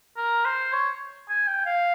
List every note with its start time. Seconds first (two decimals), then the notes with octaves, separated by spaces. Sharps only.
0.17 A#4
0.45 C5
0.73 C#5
1.29 G#5
1.48 G5
1.66 F5